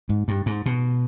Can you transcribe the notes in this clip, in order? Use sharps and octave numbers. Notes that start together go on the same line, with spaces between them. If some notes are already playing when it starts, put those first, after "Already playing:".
G#2
G2
G#2
B2